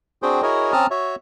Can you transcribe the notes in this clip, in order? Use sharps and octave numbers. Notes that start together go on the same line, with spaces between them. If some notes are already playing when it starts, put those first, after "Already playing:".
C4 D4 F#4 G#4 C5 G5
E4 F#4 G#4 A#4 C#5 D#5
C4 C#4 A5 A#5 D#6 F6
F#4 C#5 E5